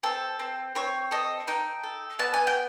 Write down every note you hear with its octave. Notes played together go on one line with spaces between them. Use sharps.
C4 A4
C4
C4 C#5
A4 D#5
D#4 G5
A4
B3 A5
G#5
G5